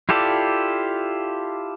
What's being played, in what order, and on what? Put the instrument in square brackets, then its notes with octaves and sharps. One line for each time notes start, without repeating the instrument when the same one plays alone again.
[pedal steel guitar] E4 F4 G4 A4 D5